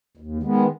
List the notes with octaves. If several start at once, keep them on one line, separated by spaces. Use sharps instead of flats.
D#2
D#3 G#3 B3